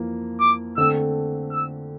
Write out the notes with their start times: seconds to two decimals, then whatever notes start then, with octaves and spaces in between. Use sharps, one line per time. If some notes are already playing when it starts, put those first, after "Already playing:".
Already playing: F2 E3 A#3
0.40 D6
0.77 D3 A3 C4 E6
1.53 E6